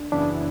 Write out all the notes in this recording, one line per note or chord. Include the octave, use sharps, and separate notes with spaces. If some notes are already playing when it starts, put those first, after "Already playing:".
Already playing: D4
F#2 C#3 E3 B3 D4 E4